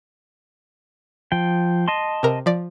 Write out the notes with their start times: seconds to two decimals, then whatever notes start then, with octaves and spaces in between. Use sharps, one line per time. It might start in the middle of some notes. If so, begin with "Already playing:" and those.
1.32 F3 G5
1.88 D#5 A5 C6
2.23 C3 A#4
2.46 F3 D5